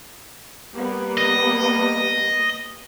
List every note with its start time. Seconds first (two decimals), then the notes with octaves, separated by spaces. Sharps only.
0.75 G3 A#3 B3
1.18 D#5